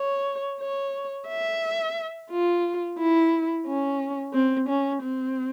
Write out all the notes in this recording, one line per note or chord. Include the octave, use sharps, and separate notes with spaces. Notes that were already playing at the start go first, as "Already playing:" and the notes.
Already playing: C#5
C#5
E5
F4
E4
C#4
C4
C#4
C4